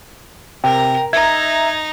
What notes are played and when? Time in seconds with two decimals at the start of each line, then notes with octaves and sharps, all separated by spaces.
0.64 C3 A#4 G5
1.13 D#4 E5 A#5 G#6